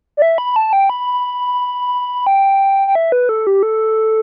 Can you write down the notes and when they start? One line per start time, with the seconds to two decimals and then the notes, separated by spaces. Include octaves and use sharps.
0.17 D5
0.22 E5
0.38 B5
0.56 A5
0.73 G5
0.90 B5
2.27 G5
2.88 G5
2.95 E5
3.12 B4
3.29 A4
3.47 G4
3.63 A4